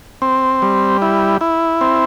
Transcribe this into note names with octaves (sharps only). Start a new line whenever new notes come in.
C4
G3
E4
E4
C4